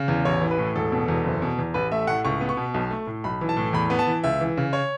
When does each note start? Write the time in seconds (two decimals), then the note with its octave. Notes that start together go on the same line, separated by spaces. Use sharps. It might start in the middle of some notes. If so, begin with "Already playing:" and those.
Already playing: C#3
0.08 E2
0.25 A1 C#5
0.41 E3
0.51 B4
0.58 A2
0.75 E1 A4
0.92 B2
1.08 E2
1.24 F#1
1.42 B2
1.59 E2
1.74 A1 B4
1.91 A3 E5
2.07 A2 F#5
2.25 C#2 C#6
2.40 B3
2.49 C#6
2.57 B2
2.74 B1
2.91 A3
3.07 A2
3.24 B1 B5
3.41 E3
3.49 A5
3.57 A2
3.73 E2 B5
3.90 B3
3.99 A5
4.07 E3
4.24 C#2 E5
4.41 E3
4.57 C#3
4.73 C#5